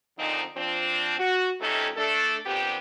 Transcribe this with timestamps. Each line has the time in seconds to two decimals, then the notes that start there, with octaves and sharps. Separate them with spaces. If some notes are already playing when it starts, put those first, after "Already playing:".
0.19 A#2 D3 F3 C4 D#4
0.56 F3 C4 D4
1.19 F#4
1.61 F2 C3 A3 C#4 D#4 A4
1.97 A3 D4 A4
2.46 A#2 D3 B3 C4 G4